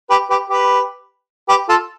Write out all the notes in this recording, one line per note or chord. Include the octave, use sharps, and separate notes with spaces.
G4 B4
G4 B4
G4 B4
G4 B4
F4 A4